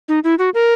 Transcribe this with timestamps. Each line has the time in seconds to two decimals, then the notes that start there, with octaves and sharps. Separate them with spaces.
0.09 D#4
0.24 E4
0.39 F#4
0.54 A#4